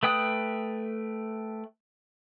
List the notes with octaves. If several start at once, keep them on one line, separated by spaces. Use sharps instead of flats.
A3 B4 G5 D#6 F#6